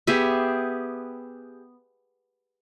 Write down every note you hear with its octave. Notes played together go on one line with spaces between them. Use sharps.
B3 G4 G#4 E5